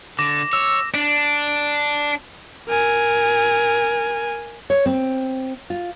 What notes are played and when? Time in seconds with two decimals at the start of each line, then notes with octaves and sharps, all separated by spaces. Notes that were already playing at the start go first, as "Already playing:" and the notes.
0.19 D3 D6 A#6
0.53 C#5 E6
0.94 D4
2.69 A#4 G#5
4.70 C#5
4.86 C4
5.70 F4